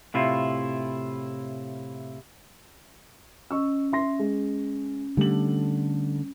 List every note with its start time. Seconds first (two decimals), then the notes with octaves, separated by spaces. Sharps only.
0.14 A2 C3 E4 F4
3.51 C#4 D#5 C#6 E6
3.93 E5 C6 A#6
4.19 G#3
5.17 D3 G3 A3 F#7